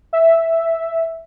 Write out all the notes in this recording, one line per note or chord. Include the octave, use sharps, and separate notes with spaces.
E5